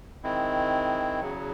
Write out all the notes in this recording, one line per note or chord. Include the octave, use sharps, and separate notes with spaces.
D#3 G#3 C4 E4
E2 C#3 F#3